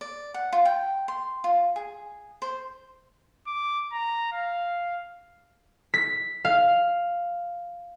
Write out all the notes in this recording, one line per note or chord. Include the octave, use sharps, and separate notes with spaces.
D5
F#5
F4
G5
C6
F4
G#4
C5
D6
A#5
F5
B6
F5